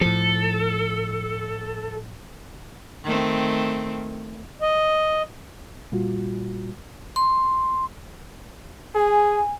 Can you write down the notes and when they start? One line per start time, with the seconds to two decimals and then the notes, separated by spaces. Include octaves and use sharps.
0.01 A2 F3 A4
3.04 D#3 A3 C4
4.62 D#5
5.92 A#2 G3 F4 F#4
7.16 C6
8.95 G#4 G#5